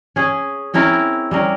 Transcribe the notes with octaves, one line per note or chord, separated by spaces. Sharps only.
C#4 G#4
C4 C#4 E4 A#4
G3 C#4 A#4